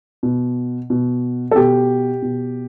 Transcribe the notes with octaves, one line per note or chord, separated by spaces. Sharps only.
B2
B2
A4
B2 G4
B2